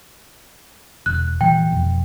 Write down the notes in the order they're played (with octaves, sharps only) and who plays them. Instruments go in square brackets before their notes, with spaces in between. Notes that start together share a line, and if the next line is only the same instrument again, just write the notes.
[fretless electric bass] E1 [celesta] F#6
[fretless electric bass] A#2 E3 G3 [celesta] G5
[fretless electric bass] F1 F2 B2